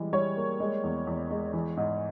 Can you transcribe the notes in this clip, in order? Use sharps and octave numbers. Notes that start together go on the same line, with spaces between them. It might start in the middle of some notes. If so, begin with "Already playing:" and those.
Already playing: E3 G3 G#3
G3 C#5
A#3
G#3
E2
E2
G#3
E3
G#2